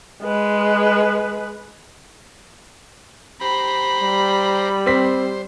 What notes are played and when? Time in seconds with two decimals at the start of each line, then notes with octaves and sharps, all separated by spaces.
0.24 G#3 B4
3.41 G4 C5 A#5 B5
4.01 G3
4.86 C4 C5 B6